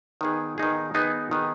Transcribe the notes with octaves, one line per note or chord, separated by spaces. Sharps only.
D#3 B3 D#4 G#4
D#3 B3 D#4 G#4
D#3 B3 D#4 G#4
D#3 B3 D#4 G#4